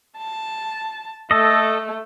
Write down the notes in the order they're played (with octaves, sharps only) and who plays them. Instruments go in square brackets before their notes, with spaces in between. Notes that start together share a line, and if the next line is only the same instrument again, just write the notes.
[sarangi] A5
[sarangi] A3 [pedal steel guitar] A4 D#5